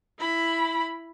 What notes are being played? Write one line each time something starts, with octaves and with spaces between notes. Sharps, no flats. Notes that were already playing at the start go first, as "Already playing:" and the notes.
E4 B5